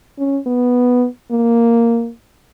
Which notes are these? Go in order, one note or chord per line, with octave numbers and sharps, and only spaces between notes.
C#4
B3
A#3